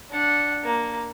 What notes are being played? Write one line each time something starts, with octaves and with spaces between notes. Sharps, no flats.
D4 F#5
A#3